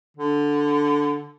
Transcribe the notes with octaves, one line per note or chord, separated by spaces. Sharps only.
D3